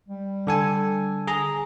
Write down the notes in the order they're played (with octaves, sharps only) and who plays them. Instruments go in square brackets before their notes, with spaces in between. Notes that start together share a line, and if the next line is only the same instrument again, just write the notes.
[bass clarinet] G3
[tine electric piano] D3 A4 G#5
G#4 A#5